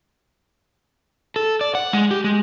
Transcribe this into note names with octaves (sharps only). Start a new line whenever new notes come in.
A4
D5
F#5
G#3
G4
G#3